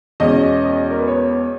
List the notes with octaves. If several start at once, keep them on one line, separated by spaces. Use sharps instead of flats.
E2 B2 G#3 C#4 D#5
A#4
B4
C#5